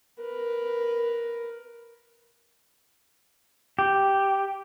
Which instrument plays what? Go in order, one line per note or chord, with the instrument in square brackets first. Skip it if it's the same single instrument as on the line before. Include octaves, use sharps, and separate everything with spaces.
[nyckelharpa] A#4 B4
[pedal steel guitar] G4